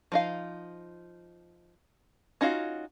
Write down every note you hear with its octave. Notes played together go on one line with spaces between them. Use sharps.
F3 D#4 F5
C#4 D#4 F4 F#4 F5